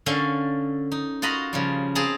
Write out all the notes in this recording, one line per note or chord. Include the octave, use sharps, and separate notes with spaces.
D3 C#4 A4 F5
D#4
F4 F#4 D#5 A#5 B5
C#3 F3 G3
C4 G#4 F#5 A5 A#5